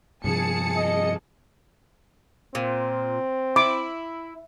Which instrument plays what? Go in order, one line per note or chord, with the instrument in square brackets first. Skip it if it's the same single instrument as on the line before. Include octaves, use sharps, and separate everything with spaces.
[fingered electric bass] G2 C3 F3 [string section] G#4 A5 C#7
[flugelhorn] D#5
[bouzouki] A#2 [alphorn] C4
[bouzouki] E4 [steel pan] D6